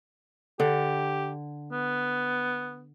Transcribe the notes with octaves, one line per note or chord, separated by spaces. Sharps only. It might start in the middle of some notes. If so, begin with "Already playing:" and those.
D3 G4
B3